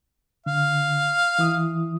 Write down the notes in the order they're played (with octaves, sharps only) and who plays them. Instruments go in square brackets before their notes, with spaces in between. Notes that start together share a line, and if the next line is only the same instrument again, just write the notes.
[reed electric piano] D3 [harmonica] F5
[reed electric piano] E3 E4 D#6